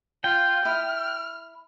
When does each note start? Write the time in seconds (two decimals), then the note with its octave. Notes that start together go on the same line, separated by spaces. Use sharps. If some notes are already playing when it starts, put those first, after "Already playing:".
0.24 F4 G5
0.65 E4 B5 D#6 F6